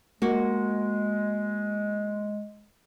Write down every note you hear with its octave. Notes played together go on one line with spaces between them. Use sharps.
G#3 A#3 F#4